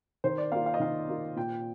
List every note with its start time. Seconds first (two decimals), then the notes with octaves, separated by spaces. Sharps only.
0.24 D#3 C5
0.38 D5
0.52 A#3 F4 F5
0.66 F5
0.74 D#5
0.80 D#3 F5
1.08 A#3 F4
1.36 A#2 G5